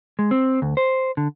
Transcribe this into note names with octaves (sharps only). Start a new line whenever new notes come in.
G#3
C4
D2
C5
D3